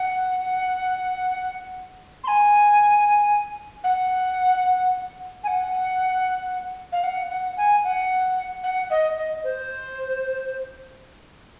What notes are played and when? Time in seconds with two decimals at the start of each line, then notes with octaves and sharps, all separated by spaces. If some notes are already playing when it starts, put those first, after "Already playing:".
Already playing: F#5
2.24 C6
2.28 G#5
3.84 F#5
5.44 G#5
5.48 F#5
6.92 F5
7.04 F#5
7.30 F#5
7.57 G#5
7.84 F#5
8.64 F#5
8.90 D#5
9.16 D#5
9.44 C5